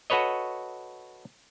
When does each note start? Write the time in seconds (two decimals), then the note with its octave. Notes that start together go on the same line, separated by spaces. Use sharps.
0.10 F#4 A4 B4 C#5 D#5